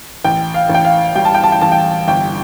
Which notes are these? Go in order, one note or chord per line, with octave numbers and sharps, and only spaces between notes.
A1 G5
F5
A1 G5
F5
G3 G5
A5
G5
A5
G5
A1 A5
G5
G1 G5